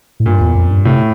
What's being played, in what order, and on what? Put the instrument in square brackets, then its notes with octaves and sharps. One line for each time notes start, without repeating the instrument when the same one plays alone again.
[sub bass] A2
[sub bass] G2 [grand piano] A#2
[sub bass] E2
F2
G2
[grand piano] A2 [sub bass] C3